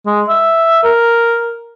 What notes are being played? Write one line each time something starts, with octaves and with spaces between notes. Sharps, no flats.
G#3
E5
A#4